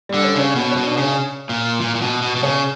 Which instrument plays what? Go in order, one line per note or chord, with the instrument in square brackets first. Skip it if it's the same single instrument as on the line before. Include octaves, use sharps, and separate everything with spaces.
[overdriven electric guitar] D3 [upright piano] G3
[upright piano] C#4
[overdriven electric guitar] C#3
[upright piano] C#4
[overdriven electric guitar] B2 [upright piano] B3
[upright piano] C#4
[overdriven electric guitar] B2
[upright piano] D4
[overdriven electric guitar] C#3
[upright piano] C#4
[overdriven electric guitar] A#2
A#2
A#2
B2
B2
B2
[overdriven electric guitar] C#3 [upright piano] C#4